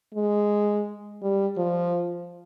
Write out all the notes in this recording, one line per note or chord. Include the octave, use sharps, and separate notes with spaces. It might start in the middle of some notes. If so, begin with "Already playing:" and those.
G#3
G3
F3